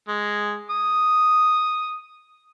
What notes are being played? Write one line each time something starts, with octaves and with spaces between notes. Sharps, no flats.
G#3
D#6